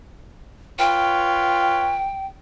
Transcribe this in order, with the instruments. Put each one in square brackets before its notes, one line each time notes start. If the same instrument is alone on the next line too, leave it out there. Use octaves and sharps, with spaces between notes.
[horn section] F4 B4 C#5 [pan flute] G5